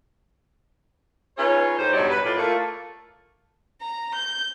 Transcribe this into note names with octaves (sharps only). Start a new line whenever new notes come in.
C#4 D#4 F4 G#4 B4 C#5
A2 D#4 G4 C5
E2 G2 B2 F#3 C#5 D5
B4
A2 F4 D5
A3 A#3 F4
A#5
G6